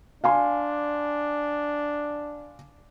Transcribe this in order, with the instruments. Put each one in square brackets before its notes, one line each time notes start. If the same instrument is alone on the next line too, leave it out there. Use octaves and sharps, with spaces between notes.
[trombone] D4 [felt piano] F5 G#5 C6